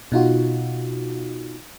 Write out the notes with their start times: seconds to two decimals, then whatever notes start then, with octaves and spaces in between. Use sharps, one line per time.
0.12 B2 D#4 F4 F#4